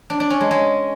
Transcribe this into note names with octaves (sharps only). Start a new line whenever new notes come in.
D4
D4
C#4
G#3
G#3